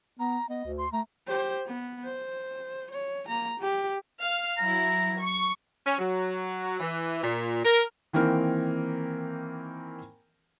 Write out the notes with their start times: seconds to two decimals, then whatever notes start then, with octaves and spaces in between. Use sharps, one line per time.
0.20 B3 A#5
0.49 B3 D#5
0.65 D2
0.78 C6
0.93 A3 A#5
1.28 G4 C5
1.66 B3
2.05 C5
2.91 C#5
3.28 A#3 A#5
3.59 G4
4.20 F5
4.58 F#3 E4 A#5
5.18 C#6
5.86 C#4
5.99 F#3
6.80 E3
7.23 A#2
7.65 A#4
8.13 D#3 E3 A#3 C4 A#4